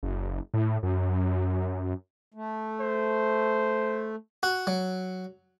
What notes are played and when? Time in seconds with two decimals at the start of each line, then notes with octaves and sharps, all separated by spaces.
0.03 F#1
0.54 A2
0.83 F#2
2.34 A3
2.80 C5
4.43 F#4
4.67 F#3